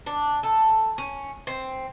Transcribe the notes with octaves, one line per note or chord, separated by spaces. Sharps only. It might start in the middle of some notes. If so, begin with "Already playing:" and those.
D4
A4
C#4
C4